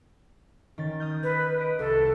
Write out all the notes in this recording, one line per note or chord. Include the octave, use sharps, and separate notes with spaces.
D#3 C#4 A6
D#6 F6 G6
B4
D#5 D7
C2 A4